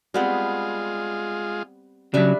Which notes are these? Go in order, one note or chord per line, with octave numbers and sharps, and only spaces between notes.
G3 G#3 B3 C4 F4
C#3 F#3 G3 D4 E5